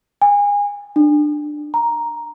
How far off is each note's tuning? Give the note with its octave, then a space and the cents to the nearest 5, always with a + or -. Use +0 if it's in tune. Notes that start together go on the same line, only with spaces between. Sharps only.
G#5 -30
D4 +20
A#5 +5